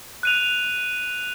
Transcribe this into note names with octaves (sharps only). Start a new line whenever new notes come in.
F#6 D#7 F7